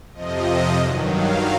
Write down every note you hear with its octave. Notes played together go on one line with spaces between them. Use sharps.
F2 C3 F3 D#5
G2 D#3 F#3
F5